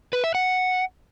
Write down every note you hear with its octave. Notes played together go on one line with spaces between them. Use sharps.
B4
E5
F#5